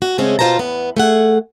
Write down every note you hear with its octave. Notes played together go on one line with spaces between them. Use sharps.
F#4
C#3 G#3 A3 C4 C#4 G#4
B2 F4 A#4 C5 A5 A#5
E2 B3
A3 G#4 F#5